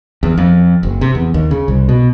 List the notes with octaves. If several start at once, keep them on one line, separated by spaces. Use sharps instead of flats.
E2
F2
F#1
C3
E2
D#2
C#3
C2
B2